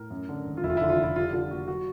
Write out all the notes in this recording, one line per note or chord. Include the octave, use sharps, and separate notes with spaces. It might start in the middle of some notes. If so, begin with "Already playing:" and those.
Already playing: A2 A#4
F#2
D3
G#1
F4
F1 E4
F4
E4
D3
F4
F1
E4
G3 F4
D3 F4
A#3 F#4
F#3 F#4